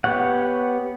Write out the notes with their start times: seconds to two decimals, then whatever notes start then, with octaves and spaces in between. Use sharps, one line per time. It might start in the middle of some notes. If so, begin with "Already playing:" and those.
0.04 B3 G4 C#5 F#5